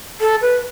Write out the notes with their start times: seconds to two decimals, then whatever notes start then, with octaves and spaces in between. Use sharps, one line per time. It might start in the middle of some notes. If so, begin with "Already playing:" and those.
0.21 A4
0.42 B4